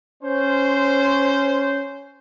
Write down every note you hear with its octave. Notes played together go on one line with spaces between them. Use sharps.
C#4 C5